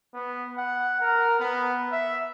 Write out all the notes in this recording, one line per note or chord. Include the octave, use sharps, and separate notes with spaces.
B3
F#5
A#4
B3
E5